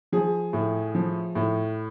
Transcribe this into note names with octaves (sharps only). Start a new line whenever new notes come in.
F3 G#4
A2
F3
A2